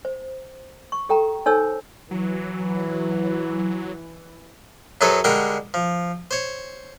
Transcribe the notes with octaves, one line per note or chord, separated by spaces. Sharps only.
C5
C#6
G4 A4 G5 A#5
D#4 A4 C5 C#5 G#5 E6
E3 F#3
F#2 F#3 G#4 A4 B4 C5
D3 G3 G#3 A#4 F#5 G5
F3
C5 C#5